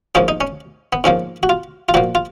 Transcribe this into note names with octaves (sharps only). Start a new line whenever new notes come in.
G#2 F3 A#3 C#4
D#4
C#4
B3
G#2 F3 A#3 C#4
F#4
F4
F4
A#2 F3 A#3 F#4
F4